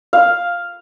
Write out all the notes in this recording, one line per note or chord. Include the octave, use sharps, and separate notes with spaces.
F5